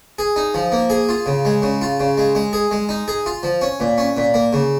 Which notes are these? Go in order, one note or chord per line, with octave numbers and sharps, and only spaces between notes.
G#4
D#4
F3
A#3
G#4
F4
C#3
G#3
C#3
F4
C#3
G#3
G#3
G#4
G#3
D#4
G#4
F4
F3
C#4
A#2
C#4
A#2
A#3
C#3